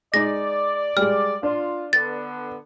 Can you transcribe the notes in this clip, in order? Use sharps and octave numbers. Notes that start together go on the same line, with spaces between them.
G#3 D#4 D5 A#6
G3 G#3 F6
D4 F4
D3 B3 A6